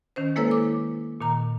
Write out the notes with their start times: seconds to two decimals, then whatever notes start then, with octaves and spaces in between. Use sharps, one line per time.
0.16 D#3 C#4 C5
0.36 G#3 A#3 E4 A4 B4 C#5
0.51 D6
1.21 A#2 D#3 A#5